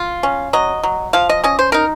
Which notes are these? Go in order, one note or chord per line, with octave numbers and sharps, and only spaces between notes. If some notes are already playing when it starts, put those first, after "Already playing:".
Already playing: F4
C#4
F#3 D#5
F#3
F3 F5
D#5
C#4 D#5
C5
D#4 A#4